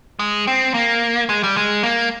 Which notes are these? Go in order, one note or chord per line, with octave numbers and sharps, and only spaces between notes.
G#3
C4
A#3
G#3
G3
G#3
A#3